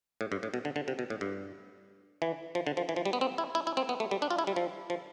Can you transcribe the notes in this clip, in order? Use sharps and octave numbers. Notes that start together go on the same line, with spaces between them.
A2
G2
A2
B2
D3
D3
C3
B2
A2
G2
E3
F3
D3
F3
E3
F3
G3
B3
C4
E4
E4
E4
C4
B3
A3
G3
D4
F4
E4
G3
F3
F3